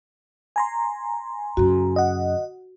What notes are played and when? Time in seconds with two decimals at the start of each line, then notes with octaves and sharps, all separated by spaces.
0.56 G#5 A#5 C6
1.57 F#2 C#3 F#4
1.96 D#5 F#5